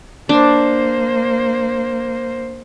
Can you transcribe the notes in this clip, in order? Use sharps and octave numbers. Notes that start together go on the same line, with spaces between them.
A#3 D4 C5